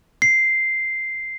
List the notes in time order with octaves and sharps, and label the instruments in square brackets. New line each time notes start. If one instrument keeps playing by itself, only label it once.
[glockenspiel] C7